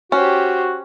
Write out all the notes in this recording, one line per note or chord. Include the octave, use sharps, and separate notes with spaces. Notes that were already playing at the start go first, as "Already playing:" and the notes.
C#4 F#4 G4 C5